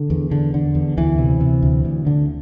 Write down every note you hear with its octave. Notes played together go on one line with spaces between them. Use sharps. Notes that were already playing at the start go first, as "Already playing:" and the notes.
Already playing: D3
E2
D3
D3
E2
D2 E3
C3
C3
D2
D2
D3